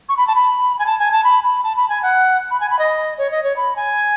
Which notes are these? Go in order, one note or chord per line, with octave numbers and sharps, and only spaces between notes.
C#6
B5
A5
B5
G#5
A5
G#5
A5
B5
B5
A5
B5
G#5
F#5
B5
G#5
B5
D#5
C#5
D#5
C#5
B5
G#5